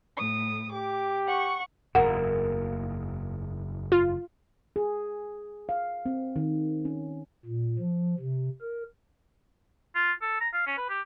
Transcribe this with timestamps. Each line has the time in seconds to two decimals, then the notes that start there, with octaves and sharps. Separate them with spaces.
0.16 A2 D#6
0.70 G4 D6
1.27 F#5 C#6
1.95 F#1 E2 G#2 A#3 F#5
3.92 F4
4.76 G#4
5.69 F5
6.06 C4
6.36 D#3
6.85 C#4
7.45 A#2
7.79 F3
8.19 C3
8.61 A#4
9.95 F4
10.22 A4
10.41 A#5
10.53 F5
10.67 C#4
10.78 B4
10.89 G4